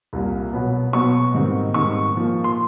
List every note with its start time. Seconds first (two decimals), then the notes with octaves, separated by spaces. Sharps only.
0.13 C2 A#2 G3 A#3
0.53 B2 F#3 B3
0.93 B2 F#3 B3 C#6
1.34 G#2 D#3 G3 C4
1.74 G#2 D#3 G3 C4 C#6
2.15 A#2 F3 A#3
2.44 C6